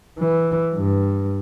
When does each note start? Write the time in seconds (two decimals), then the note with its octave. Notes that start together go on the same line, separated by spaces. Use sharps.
0.19 E3
0.75 G2